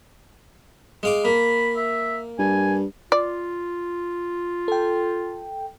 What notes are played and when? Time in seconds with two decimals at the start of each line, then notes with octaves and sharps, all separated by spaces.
1.03 G#3 F5 D6
1.25 A#3 B5
1.77 E5
2.39 G2 G#5
3.12 F4 D5
4.68 A4 G5